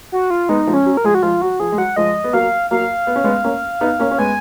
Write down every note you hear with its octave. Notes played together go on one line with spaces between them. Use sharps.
F#4
F4
G#3 B3 D#4
F3 G#3
C#4
F#3
A#4
F3 G#3 G#4
F#4
F3 G#3 F4
F#3 F#4
F3 G#4
G#3
F#3 F#5
F3 G#3 D#5
B3
F#3 A#3 F5
F#3 A#3 F5
B3
C#4
G#3 B3
A#3 C#4
B3 D#4
A#3 C#4
C#4
G#3 B3 G#5